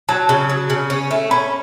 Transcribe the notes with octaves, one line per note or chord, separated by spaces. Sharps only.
F#3 A5
C#3
F#3
C#3
C#4
A3
C#4 B5